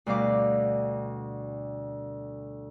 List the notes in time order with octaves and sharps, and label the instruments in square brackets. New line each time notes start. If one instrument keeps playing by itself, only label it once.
[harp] D2 B2 G3 F5 D6